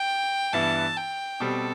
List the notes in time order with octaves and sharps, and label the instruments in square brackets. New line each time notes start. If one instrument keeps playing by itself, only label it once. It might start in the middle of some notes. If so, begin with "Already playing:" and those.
Already playing: [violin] G5
[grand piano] G2 E3 B3 E4 [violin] A5
[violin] G5
[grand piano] B2 G3 C4 [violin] A4